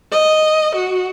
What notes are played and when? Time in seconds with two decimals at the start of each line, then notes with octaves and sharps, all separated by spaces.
0.11 D#5
0.76 F#4